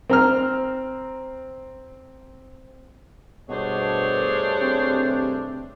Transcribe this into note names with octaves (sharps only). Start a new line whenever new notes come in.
C4 A#5 F6
G2 B2 A3 D4 G#4 C5 C#5
C3